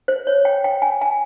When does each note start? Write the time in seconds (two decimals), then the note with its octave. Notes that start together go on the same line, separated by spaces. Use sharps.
0.08 C5
0.27 C#5
0.45 G5
0.64 G5
0.82 G#5
1.01 G#5